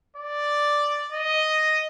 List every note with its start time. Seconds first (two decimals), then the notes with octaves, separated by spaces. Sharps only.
0.16 D5
1.12 D#5